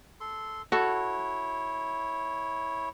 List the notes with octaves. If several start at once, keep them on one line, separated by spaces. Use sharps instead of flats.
A4 C6
E4 F#4 A4 C#5